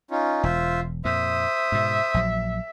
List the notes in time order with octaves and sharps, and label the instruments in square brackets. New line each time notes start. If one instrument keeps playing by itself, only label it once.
[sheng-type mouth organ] C#4 D#4 F4
[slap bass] E1 [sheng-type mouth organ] F4 C5 E5
[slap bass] F2 A#2 [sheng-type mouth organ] C5 D#6 [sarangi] E5
[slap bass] G#2 B2
A#1 F#3